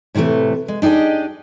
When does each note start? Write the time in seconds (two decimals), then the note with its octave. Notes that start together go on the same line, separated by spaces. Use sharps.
0.15 A2 C3 E3 G3 A3
0.68 G#3
0.82 D4 D#4 G4 G#4 D#5